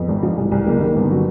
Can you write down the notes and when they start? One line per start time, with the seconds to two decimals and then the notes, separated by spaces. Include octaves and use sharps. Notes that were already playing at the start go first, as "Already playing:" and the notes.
Already playing: F2 B3
0.08 G#1
0.23 F3
0.37 C2
0.52 C2
0.66 F#1 A#3
0.81 D#3
0.95 G1 B3
1.10 F#3